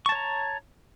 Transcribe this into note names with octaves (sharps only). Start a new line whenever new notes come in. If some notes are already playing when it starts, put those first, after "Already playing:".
C#5 A5 A#5 C#6